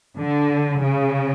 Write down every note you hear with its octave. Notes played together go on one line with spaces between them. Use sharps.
D3
C#3